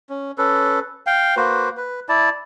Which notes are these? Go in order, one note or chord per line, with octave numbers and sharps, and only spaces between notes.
C#4
C#4 A4 B4
F5 G5
A#3 F#4 B4 C5
B4
E4 D5 A5